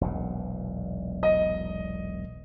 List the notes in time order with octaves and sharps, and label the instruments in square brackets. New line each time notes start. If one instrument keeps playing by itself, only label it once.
[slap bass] E1 B1 A#2
[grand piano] D#5